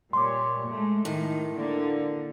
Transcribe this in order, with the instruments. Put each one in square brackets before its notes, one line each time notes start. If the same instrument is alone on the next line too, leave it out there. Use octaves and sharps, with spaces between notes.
[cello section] A#2 G3 C#5 [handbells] C6 D6
[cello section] G#3 A3
[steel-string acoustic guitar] A2 [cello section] D#3
[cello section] D3 A#3